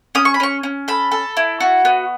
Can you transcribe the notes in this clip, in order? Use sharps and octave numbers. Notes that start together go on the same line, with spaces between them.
C#4 D#6
C#6
B5
C#4 C#6
C#4
A4 B5
A4
E4
F#4
B3